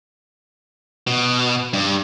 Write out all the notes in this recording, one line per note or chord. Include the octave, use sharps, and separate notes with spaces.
B2
G2